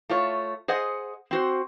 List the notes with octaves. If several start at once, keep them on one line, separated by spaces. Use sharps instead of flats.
A3 F4 C#5
G#4 C5 D#5 F#5
C4 F#4 C5